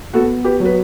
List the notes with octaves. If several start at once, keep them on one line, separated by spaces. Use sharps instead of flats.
B3 F#4 A4
G4 B4
F#3
B4